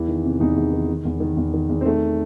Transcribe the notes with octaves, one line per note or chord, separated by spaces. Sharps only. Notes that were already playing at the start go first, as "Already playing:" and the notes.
Already playing: E2 E3
D#3
C3
E2 D#4
E2
D#3
D#3
E2
D#3
E2
D#3
E2
C4
D#3 A3